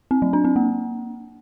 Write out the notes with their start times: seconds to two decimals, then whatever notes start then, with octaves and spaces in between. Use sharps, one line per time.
0.11 C4
0.22 F#3
0.33 D4
0.45 C4
0.56 A#3